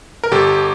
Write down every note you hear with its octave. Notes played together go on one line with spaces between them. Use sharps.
A#4
G1 G4 A4